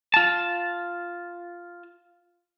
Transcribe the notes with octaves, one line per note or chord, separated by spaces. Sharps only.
F4 A5